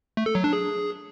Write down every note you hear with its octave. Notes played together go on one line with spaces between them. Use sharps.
A3
A4
F#3
D4
G#4